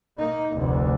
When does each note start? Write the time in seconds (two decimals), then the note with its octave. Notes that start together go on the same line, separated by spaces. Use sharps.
0.18 A#3 D#4
0.55 F1 D2